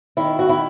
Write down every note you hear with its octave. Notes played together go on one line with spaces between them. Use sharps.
D#3 E4
F#4
D#3 E4